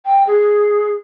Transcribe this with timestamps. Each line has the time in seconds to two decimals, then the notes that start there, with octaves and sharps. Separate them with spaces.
0.06 G5
0.27 G#4